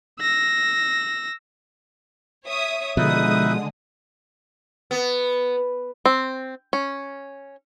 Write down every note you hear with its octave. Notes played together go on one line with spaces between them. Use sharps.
E6 A#6
C#5 E5 D#6
B2 D3 F3 G#3 D#4 B4 E5 D#6
B3
C4
C#4